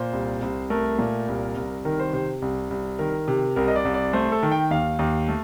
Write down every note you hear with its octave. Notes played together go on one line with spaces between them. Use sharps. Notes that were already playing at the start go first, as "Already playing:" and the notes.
Already playing: A#2 C5
C2
C2
A3 A#4
A#2
C2
C2
D#3 A#4
C5
C3 C5
C2
C2
D#3 A#4
C3
C2 A#4
D#5
D5
C2
D5
A3 C5
A4
D#3
G5
D#2 F5
D#2
A3